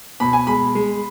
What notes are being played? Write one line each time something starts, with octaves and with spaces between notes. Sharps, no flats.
B2 B5
G#5
G#3 B5
G#3